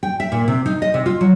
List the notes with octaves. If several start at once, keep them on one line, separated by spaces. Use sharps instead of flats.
G5
E5
A#2
C3
D#4
D#5
C3
F4
F#3